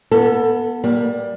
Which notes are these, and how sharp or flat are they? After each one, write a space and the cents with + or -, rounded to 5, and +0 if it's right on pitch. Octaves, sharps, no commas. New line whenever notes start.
B3 -20 A4 +20
G3 +0 A#3 +25